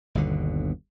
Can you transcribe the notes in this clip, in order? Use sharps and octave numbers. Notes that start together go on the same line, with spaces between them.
G1 D#2 B2 D3